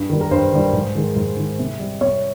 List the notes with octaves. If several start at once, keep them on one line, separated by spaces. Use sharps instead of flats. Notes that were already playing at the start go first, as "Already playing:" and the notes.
Already playing: G2
D#3 G3
A#4
G2 C5
D#3 G3
G#2
D#3 G#3
G#2
D#3 G#3
C3
G3
C3 C#5